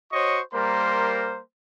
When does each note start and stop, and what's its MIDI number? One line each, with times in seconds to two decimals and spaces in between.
0.12 0.41 66
0.12 0.41 72
0.12 0.41 73
0.12 0.41 75
0.12 0.41 85
0.53 1.39 55
0.53 1.39 58
0.53 1.39 70
0.53 1.39 72
0.53 1.39 84